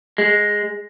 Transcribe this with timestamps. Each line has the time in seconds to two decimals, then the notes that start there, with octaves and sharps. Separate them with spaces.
0.18 G#3